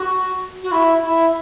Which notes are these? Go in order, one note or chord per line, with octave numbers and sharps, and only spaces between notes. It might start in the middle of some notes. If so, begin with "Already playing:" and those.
Already playing: F#4
F#4
E4
E4